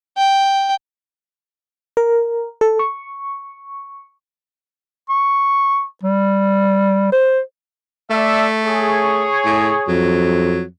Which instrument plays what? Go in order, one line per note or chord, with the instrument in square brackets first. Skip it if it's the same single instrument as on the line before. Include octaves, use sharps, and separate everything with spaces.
[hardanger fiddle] G5
[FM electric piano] A#4
A4
C#6
[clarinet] C#6
G3
C5
[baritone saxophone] A3 [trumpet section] A4 D5 E5
[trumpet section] G#4 C#5
[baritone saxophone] A2
[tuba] F2 [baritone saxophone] F#3